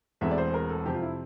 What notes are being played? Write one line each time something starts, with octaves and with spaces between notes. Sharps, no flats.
E1 E2 E3 A3 C4 E5
D5
C5
A#4
A4
F2 C3 F3 C4 G4
F4
E4